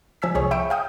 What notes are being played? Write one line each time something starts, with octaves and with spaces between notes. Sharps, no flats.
F3 G#5 E6 B6
C2 G#4 C#5
E5 G5 B5 C#6 E6 D7
F5 G5 D#6